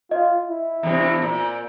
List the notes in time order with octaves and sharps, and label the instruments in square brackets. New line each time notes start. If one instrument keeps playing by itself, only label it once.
[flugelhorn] F4 [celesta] D#5
[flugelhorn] E4
[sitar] E2 G2 C3
A#2